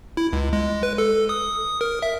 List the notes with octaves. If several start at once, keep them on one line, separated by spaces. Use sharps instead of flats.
E4
C#2
G#3
B4
A4
D#6
A#4
E5